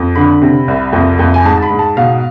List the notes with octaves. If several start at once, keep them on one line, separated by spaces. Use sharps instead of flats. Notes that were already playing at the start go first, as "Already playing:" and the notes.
Already playing: F2
D3 B5
C3
C2
F2
F2
G#5
G#2 A5
A5
B5
G#2
A5
B2 F5